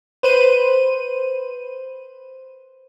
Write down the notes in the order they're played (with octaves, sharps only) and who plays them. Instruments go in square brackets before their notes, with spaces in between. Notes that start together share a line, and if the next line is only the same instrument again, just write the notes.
[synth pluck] B4 C5 D#7